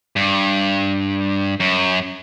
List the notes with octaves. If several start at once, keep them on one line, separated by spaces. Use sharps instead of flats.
G2
F#2